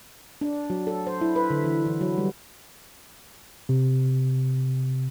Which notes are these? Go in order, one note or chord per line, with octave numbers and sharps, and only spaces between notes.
D4
F#3
A4
C5
E4
B4
D3
E3
E3
F#3
G3
C3